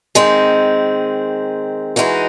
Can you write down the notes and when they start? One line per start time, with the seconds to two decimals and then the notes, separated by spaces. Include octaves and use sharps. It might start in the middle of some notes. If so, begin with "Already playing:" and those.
0.15 D#3 G#3 C4
1.96 E3 G#3 D#4 F#4